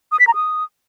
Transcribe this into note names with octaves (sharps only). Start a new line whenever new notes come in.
D#6
B6
A#5
D#6